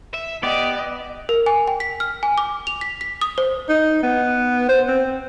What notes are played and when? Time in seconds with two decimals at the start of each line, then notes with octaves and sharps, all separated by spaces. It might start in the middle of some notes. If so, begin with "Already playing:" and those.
0.14 E5
0.43 B3 G4 D5 D#5
1.29 A#4
1.46 G#5
1.68 G5
1.80 B6
2.00 F6
2.23 G#5
2.38 D6
2.67 F7
2.81 B6
3.01 B6
3.21 D#6
3.38 C5
3.69 D#4
4.03 B3
4.69 C5
4.88 C4